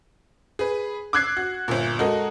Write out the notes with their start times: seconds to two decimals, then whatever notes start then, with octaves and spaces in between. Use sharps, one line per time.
0.59 G#4 B4
1.13 D6 E6 F#6 G#6 C7
1.37 F#4
1.68 G1 A#2
1.99 G#3 F#4 A4 A#4 D#5